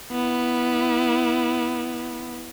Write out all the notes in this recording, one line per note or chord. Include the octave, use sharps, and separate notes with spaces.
B3 E4